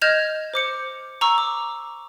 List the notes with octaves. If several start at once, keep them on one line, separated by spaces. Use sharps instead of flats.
D#5 F6 G6 G#6 E7 F7
C5 D6 C#7
A#5 C#6 E6
D6